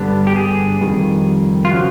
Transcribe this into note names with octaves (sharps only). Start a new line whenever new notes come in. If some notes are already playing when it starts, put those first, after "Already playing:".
Already playing: G2 D3 G3 B3 D4
G4
G#4
F2 C3 D#3 G3
F4
C#3 F3 F#4